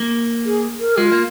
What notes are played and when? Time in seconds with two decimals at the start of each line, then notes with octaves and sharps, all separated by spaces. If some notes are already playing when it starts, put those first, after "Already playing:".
Already playing: A#3
0.46 G#4
0.79 A#4
0.97 G#3 F4
1.12 A#3